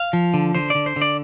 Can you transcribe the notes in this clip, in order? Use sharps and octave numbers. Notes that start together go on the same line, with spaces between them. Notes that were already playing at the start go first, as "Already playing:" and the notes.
Already playing: F5
F3
D3
D3 C5
D3 D5
C5
D3
D5